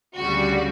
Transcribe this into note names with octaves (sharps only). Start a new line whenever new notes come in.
D2 C#3 G3 F#4